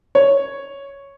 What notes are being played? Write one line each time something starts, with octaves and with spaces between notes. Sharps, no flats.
C#5